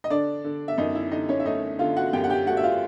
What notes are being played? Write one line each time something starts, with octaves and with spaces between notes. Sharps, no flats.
D#5
D3 D4 D5
D3
E5
F#2 D#4 D#5
E4 E5
D3 D#4 D#5
C#4 C#5
E5
A3 D#4 D#5
D3 F4 F5
F#4 F#5
F#2 G4 G5
F#5
G4 G5
A3 F#4 F#5
E5
F4 F5